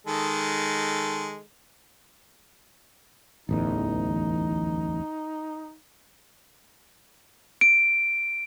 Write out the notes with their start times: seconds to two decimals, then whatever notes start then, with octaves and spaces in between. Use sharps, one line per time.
0.07 D#3 G#3 A4
3.49 D1 A1 E2 D#4
7.61 D7